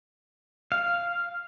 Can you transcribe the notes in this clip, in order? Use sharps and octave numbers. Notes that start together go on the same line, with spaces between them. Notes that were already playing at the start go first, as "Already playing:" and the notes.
F5